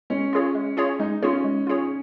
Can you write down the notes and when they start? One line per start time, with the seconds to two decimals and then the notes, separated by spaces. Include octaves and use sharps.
0.10 G#3 C#4
0.33 F4 G#4 C#5
0.55 G#3
0.77 F4 G#4 C#5
1.00 G#3 D#4
1.22 C#4 F4 G#4 C#5
1.44 G#3
1.67 F4 G#4 C#5